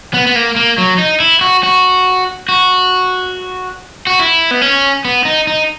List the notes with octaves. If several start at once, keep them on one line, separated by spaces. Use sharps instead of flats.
B3
B3
A#3
A#3
F#3
D#4
E4
F#4
F#4
F#4
F#4
E4
B3
C#4
B3
D#4
D#4